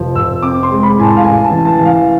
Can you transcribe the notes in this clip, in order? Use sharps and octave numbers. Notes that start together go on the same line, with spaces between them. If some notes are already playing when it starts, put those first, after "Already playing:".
Already playing: F1 F3
F1 E6
C4 D6
C6
G#3
B5
A2 G#5
A5
F5
A1 G#5
A5
E3
A5
E3
F5